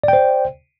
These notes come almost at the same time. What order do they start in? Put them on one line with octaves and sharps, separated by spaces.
D5 G5 C5